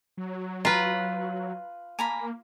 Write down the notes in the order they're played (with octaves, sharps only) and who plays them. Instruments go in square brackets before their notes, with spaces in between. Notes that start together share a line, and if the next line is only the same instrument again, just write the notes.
[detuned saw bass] F#3
[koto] F4 B4 [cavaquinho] A#5
[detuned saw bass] A#3 [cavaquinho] G#5 A#5 B5